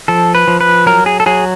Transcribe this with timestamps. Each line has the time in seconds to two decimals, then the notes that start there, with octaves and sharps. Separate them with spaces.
0.08 F3 A4
0.35 B4
0.48 F3
0.61 B4
0.86 F#3 A#4
1.06 G#4
1.20 A4
1.26 F#3 G#4